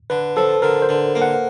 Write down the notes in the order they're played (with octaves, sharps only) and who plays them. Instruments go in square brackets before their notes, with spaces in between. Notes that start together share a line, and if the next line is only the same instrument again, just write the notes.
[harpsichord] D3 [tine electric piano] B4
[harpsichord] F3 [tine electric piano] A4
[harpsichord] D3 [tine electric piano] A#4
[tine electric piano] C5
[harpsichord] D3
A#3
[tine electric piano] F#5